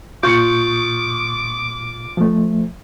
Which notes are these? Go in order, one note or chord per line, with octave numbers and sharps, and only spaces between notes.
A#2 F4 C#6 D6 G6 C#7
F3 A3